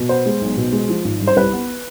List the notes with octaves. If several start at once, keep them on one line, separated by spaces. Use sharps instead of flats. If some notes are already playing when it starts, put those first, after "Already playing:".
Already playing: B2
B3 C5
G#3
B1
B2
G#3
F3
G#1
G2
C5
C2 B4
B3